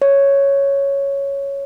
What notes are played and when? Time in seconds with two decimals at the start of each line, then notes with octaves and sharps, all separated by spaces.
0.02 C#5